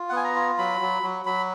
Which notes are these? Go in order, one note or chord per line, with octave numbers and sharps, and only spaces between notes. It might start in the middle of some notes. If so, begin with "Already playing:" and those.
Already playing: F4
F#5
B3 G#5
A#5
F4
F#3 B5
F#3
F#3
F#3 B5